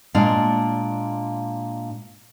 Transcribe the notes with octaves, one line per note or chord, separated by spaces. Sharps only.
A#2 G#3 A#3 D4 F5